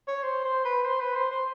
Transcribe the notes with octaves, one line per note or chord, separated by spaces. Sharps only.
C#5
C5
C5
B4
C5
B4
C5
C5